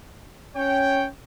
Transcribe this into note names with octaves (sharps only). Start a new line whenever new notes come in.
C#4 C#5 G5